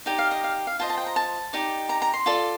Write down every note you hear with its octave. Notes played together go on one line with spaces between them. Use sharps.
D#4 G4 D5 G5
F5
D#5
F5
F5
F4 C5 D#5 A5
A5
G5
A#5
A5
D#4 G4 D5
A#5
A#5
C6
F4 A4 D5